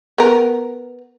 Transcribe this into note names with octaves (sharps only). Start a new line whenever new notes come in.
B3 A#4